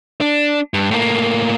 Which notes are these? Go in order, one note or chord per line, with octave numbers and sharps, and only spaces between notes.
D4
G2
A2 A#3